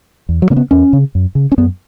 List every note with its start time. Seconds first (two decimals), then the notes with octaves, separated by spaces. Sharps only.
0.29 E2
0.42 F#3
0.50 C#3 A#3
0.56 B3
0.71 E2 C#4
0.93 C#3
1.15 F#2
1.35 C#3
1.52 C#4
1.58 F#2 B3